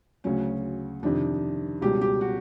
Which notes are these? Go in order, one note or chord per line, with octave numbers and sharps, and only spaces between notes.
D2 C#3 F#3 C#4
F2 C3 D#3 D4
C#2 B2 G3 G4
G4
F#4